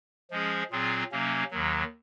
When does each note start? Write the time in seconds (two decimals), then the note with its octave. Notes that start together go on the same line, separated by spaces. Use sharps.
0.31 F3 G#3 C#4 G#4
0.71 A#2 F#3 C4 F4 G#4
1.12 C3 F#3 A#3 C#4
1.51 D#2 D#3 F#3